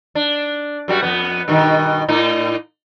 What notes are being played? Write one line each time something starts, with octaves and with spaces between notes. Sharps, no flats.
D4
F#2 G3 F#4
F2 B3
G2 B2 D#3
A2 D#4